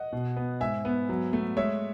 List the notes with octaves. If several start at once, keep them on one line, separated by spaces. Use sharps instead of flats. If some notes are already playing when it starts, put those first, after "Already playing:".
Already playing: D#5 F#5
B2
B3
G#2 E5 G#5
B3
F#3
A3
G#3 C#5 E5